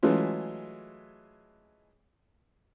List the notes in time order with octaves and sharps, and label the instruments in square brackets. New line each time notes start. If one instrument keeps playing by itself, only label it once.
[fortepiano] E3 F#3 G#3 A3 C#4 F4